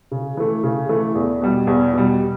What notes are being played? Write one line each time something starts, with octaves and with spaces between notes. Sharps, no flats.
C#3
E3 A3
C#3
E3 A3
E2
B2 G3
E2
B2 G3